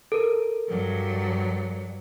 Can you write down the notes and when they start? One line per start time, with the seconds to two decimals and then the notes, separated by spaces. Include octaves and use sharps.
0.12 A4 A#4
0.68 G2 F#3